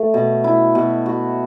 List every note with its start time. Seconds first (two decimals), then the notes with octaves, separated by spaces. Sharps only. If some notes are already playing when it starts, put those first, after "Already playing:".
Already playing: A3
0.14 B2
0.44 E4
0.75 B2
1.06 F#4